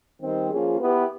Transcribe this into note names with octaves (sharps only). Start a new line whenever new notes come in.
D#3 G3 C4
F3 A#3 C#4 F4 G#4
B3 E4 G4 B4